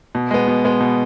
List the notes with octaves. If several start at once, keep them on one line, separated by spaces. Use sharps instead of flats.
B2
G#3 B3
B2
G#3 B3
B2